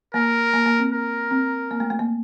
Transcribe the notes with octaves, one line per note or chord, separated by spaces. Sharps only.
A#3 A#4
A#3
A#3
C4
A#4
C4
A#3
A3
A3
A#3